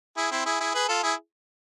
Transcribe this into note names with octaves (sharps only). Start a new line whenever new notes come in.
E4 G#4
C4 E4
E4 G#4
E4 G#4
G#4 B4
F4 A4
E4 G#4